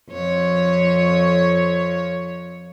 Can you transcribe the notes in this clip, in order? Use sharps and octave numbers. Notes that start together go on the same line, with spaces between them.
F2 C#5